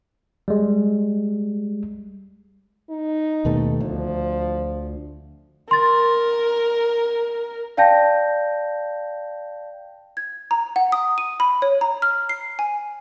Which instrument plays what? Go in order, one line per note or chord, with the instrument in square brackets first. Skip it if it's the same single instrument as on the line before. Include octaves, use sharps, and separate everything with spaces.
[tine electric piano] G3 G#3
[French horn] D#4
[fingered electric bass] D#2 B2 A3
[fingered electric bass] D2 [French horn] F3
[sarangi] A#4 [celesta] C6 A6
[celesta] D5 F5 G5 A5 G6 A#6
[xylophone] G#6
A#5
F#5
D#6
D#7
B5
C#5
A#5
F6
C7
G#5